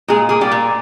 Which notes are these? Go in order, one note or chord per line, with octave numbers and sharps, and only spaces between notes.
A#2 G#3 G#4
A#3 G#4
G3 G4
A#2